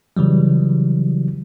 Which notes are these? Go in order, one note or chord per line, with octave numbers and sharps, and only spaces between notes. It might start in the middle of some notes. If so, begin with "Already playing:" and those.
C#3 E3 F#3 G3